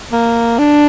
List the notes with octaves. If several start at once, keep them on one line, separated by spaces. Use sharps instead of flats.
A#3
D4